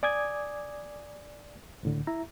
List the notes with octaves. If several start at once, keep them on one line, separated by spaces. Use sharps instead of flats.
D5 G#5 D6 D#6 G#6
C#2 A2 D3
E4 E5 A#5